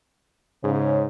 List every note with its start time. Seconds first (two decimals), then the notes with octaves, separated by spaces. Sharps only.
0.64 G#2 C#3